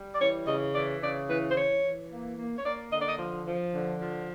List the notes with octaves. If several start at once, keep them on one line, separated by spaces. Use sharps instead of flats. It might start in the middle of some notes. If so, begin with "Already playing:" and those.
Already playing: G3
D5
E3 C#5
C#3 D#5
E3 D5
C#3 D5
E3 B4
C5
E3 C#5
E3
A#3
A#3
C#5
A#3 D5
D3 D#5
D5
D#5
F3
F3
D3
F3